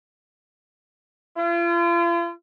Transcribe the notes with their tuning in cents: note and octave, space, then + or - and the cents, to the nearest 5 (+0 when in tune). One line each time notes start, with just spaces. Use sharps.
F4 -40